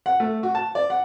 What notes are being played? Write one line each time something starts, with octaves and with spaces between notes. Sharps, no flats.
F#5
A3
F#4
A5
D5
F#5